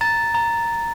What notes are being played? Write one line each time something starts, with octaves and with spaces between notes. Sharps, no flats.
A#5 A6
A#5